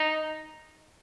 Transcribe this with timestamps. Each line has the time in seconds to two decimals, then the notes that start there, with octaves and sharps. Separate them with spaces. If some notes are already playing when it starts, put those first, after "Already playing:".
Already playing: D#4